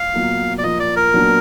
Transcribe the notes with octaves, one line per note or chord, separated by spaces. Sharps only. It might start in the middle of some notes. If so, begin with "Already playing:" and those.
Already playing: F5
B2 F#3 A#3 F4
D5
A#2 F3 A#3 F4 D#5
D5
A#4
A#2 F#3 B3 D4